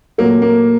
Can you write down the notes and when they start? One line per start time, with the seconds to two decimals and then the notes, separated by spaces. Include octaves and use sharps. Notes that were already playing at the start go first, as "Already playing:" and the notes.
0.18 A#2 F#3 A3 A#3
0.42 A#3